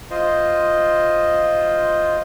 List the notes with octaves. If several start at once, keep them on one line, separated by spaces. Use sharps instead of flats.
F4 C5 D#5